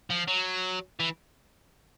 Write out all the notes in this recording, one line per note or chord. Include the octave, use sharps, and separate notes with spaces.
F3
F#3
E3